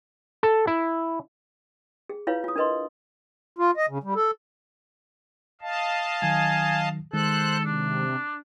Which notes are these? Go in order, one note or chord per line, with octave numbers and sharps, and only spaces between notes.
A4
E4
G#4
E4 F4 B4 C#5 F5
F4 D#6
D4 A#4 B4 D#5 C6
F4
D#5
C#3
G3
A4
D#5 F5 A5
D#3 F#3 G#5
D#3 G#3 A4 C5 F#6
C3 D4